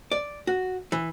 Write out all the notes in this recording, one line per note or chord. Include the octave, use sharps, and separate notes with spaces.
D5
F#4
E3